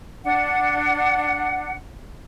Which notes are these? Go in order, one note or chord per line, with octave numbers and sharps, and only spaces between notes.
D4 F#5